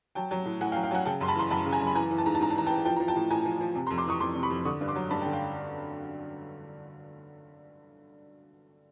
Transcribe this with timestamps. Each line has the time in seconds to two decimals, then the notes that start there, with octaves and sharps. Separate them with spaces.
0.15 F#3 G5 A5
0.31 F#3
0.45 A2
0.61 A2 F#5 G#5
0.72 F5 G5
0.76 F#3
0.83 F5 G5
0.91 F#3 F#5 G#5
1.06 C#3 G5 A5
1.21 F#2 C6
1.28 A5 B5
1.36 E3 A#5 C6
1.50 F#2 A5 B5
1.66 C#3
1.73 G#5 A#5
1.81 F#2
1.87 B5
1.95 E3 G#5 A#5
2.11 E3
2.18 A5
2.26 G#2 A#5
2.35 A5
2.40 G#2 A#5
2.50 A5
2.56 E3 A#5
2.66 G5 A5
2.70 E3
2.85 F3 G5 A5
2.96 F3 A#5
3.08 G5 A5
3.16 A2
3.30 A2 G#5 A#5
3.45 F3
3.61 F3
3.75 C3
3.87 A#5 C6
3.90 F2
3.98 C6 D6
4.06 E3 C#6 D#6
4.20 F2 C6 D6
4.35 C3
4.43 B5 C#6
4.50 F2
4.65 D3 C#6 D#6
4.81 G2
4.88 C6 D6
4.96 F#3
5.10 G2 A5 B5
5.21 G5 A5
5.25 D3
5.33 F5 G5